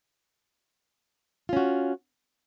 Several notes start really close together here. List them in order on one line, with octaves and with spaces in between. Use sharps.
F4 C#4 F#4